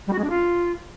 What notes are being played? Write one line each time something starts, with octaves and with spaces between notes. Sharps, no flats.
G3
F#4
G#3
D4
F4